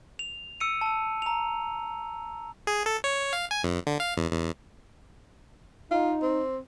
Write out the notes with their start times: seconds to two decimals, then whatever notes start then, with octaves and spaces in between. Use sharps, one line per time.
0.19 F7
0.60 E6 C#7 D#7
0.81 A5 E6
1.22 A#5 F7
2.67 G#4
2.86 A4
3.04 C#5
3.33 F5
3.51 G#5
3.64 F2
3.87 D3
4.00 F5
4.17 E2
4.32 E2
5.91 D#4 F4
6.22 C4